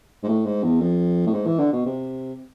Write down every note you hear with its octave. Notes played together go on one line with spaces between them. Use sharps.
G#2
A2
G#2
E2
F2
A2
G#2
E3
D3
B2
C3